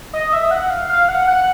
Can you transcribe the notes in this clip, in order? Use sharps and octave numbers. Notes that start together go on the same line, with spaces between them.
D#5
E5
F#5
F5
F5
F#5
F#5